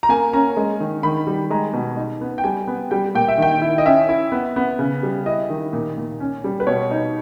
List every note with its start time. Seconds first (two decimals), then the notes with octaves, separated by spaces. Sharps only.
0.03 A#5
0.09 A#3 G#5
0.33 C#4 A#5
0.57 G#3
0.80 D#3
1.03 D#3 B5
1.27 G3
1.50 G#3 A#5
1.73 B2
1.97 D#4
2.21 B3
2.38 G5
2.44 G3 G#5
2.68 B3
2.91 G3 G5
3.15 A#2 G5
3.28 E5
3.38 D#3 G5
3.62 E4
3.78 D#5
3.86 C#4 E5
4.09 E4
4.32 B3
4.56 B3
4.79 C#3
5.03 G3
5.26 E4 D#5
5.50 D#3
5.73 A#2
5.97 A#2
6.20 C#4
6.44 G3
6.60 B4
6.67 B2 C#5
6.91 D#4